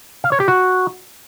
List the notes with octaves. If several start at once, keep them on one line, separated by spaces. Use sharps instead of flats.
F5
C#5
G4
F#4